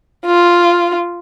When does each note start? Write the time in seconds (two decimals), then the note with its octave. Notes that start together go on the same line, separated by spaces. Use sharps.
0.26 F4